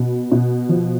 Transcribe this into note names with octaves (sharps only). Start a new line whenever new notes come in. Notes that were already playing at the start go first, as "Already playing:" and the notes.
Already playing: B2
B2
F3